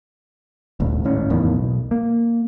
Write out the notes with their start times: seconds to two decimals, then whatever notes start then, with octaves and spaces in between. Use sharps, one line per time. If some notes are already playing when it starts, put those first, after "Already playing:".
0.80 D#1 G#1 D2
1.04 G#1 A2 C#4
1.30 F#1 E2 A2 D#3
1.54 B1
1.91 A#3